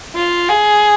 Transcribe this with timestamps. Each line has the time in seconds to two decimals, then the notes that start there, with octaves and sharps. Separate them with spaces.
0.15 F4
0.49 G#4